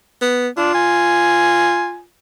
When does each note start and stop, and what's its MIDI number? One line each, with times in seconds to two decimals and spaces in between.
0.22 0.48 59
0.57 0.70 62
0.57 2.04 65
0.75 1.98 80